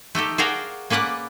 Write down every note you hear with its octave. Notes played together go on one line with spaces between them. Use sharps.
A3 D#4 G4 A4
F#4 G#4 A#4 D5 F5 G5
A#3 C#4 B4 D5 F#5